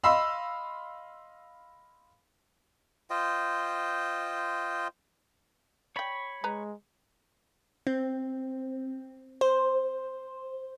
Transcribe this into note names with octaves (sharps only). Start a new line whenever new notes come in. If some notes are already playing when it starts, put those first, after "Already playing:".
D#5 F5 B5 C6 E6
F4 C5 D#5 G5
C#5 D5 G5 B5
G#3 B4 A#5
C4
C5